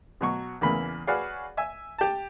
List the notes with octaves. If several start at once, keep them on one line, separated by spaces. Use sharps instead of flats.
B2 F#3 C#6
E2 C#3 E3 A#3 B5
F#4 G#4 B4 C#5 D5 F5
E5 G#5 E6
G4 A5